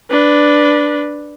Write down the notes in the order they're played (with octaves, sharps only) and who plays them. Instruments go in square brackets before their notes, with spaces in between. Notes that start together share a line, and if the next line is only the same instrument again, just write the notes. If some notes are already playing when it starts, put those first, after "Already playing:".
[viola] D4 B4